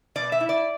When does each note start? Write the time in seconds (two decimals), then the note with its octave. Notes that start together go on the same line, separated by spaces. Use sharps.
0.15 B2 D5
0.32 E5
0.40 E4
0.49 D5